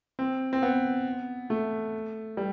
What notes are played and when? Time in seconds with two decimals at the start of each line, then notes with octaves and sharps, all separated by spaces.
0.19 C4
0.53 C4
0.63 B3
1.50 A3
2.37 G3